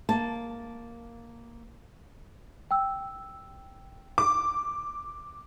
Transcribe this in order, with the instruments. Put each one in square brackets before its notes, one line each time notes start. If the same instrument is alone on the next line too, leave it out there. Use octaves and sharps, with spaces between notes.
[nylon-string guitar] A#3 A5
[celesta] G5 E6
[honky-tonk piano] D6